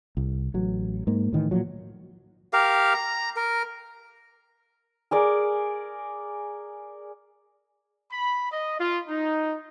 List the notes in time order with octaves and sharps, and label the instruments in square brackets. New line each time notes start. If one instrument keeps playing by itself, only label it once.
[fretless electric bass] C2
A1 F#3
G#2 A#3
A2 D#3 E3
A#2 F3 F#3
[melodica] G4 A#4 F5
A#5
A#4
[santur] G#4 A#4 D5
[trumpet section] B5
D#5
F4
D#4